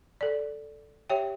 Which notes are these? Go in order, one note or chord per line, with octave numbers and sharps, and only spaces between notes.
A4 D5
G4 C#5 E5 G5